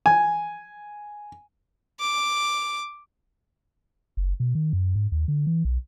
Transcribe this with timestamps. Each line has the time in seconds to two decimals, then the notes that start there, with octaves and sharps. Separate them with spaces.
0.06 G#5
2.00 D6
4.17 F#1
4.40 B2
4.55 D#3
4.73 F#2
4.95 G#2
5.12 D#2
5.28 D3
5.46 E3
5.65 B1